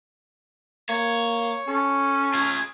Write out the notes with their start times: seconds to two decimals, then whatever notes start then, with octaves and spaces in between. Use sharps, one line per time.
0.89 A#3 C#5
1.68 C#4 A4
2.34 F4 G#4